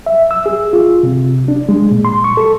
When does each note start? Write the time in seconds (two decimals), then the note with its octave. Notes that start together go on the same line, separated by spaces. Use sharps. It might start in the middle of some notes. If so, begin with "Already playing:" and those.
0.06 E5
0.31 E6
0.46 G#4
0.73 F4
1.03 C3
1.48 D4
1.69 G#3
1.91 A#2
2.05 C6
2.24 C#6
2.37 A4